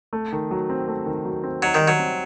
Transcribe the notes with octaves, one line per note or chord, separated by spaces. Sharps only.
A3
D#3
F#3
C4
A3
D#3
F#3
C4
F#3 D#4
D#3
G3
F#3
C4